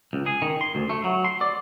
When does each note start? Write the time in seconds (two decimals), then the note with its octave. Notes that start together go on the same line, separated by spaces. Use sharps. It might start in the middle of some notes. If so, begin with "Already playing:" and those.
0.13 C#2
0.26 G#4
0.42 D#3
0.61 C6
0.75 D2
0.89 A3
1.04 F#3
1.25 C6
1.41 D5